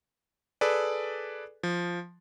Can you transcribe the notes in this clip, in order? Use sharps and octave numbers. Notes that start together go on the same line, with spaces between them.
G#4 A4 B4 D5
F3